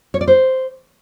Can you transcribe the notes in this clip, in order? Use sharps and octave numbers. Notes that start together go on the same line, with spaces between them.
C#5
D5
C5